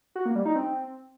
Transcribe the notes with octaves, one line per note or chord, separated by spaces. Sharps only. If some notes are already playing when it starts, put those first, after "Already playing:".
F#4
A#3
G3
D#4
C4